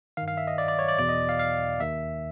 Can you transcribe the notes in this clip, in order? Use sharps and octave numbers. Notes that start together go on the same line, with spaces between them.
G2 D#3 F5
F5
E5
D#5
D5
D5
C#5
D5
E2 B2 D5
D#5
F5
F5
D#2 D#3 E5